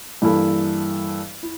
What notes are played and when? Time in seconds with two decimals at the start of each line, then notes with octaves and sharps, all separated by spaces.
0.22 G2 E3 A#3 E4 A4
1.43 E4